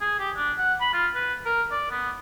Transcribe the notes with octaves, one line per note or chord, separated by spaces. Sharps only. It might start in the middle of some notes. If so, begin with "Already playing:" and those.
G#4
G4
D4
F#5
B5
F4
B4
A#4
D5
B3